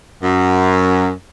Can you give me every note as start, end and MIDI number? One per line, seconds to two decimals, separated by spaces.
0.22 1.08 42